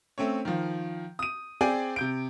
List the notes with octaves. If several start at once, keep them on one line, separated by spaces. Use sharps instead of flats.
A3 C4 C#4 C#5
D#3 F3
D#6 D#7
C4 G#4 D5 G5 G#5
C3 G6 D7